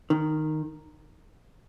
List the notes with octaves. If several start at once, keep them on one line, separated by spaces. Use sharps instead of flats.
D#3